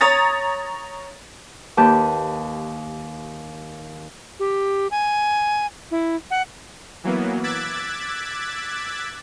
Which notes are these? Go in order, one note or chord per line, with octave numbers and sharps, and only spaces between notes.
C#5 A#5 D#6 A6
D#2 G4 B4 A5 G6
G4
G#5
E4
F#5
E3 F#3 A#3 B3
D6 E6 F#6 G#6 A6 B6